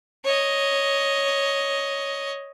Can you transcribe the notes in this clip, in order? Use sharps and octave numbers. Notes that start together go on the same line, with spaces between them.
C#5 D#5